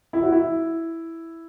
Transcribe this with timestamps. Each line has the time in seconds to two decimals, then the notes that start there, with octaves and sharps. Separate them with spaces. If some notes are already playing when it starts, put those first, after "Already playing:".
0.13 E4
0.23 F#4
0.32 E4